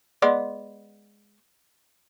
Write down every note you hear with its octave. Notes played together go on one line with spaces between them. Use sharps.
G#3 B3 D5